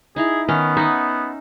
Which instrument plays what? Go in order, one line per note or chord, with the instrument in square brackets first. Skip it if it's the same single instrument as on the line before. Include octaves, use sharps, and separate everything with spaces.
[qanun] D#4 E4 A#5 [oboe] G#4
[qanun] D#3 A#4 [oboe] B3 [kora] C#4
[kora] D#4 [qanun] E5 F#5